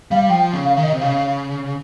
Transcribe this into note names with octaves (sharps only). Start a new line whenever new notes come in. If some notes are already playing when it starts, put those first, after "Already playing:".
G3 F5
F3 G5
C#3
F5
D#3
D#5
C3
C#3 F5